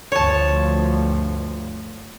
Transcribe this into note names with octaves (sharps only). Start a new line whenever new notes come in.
D2 G2 F3 C#5 A5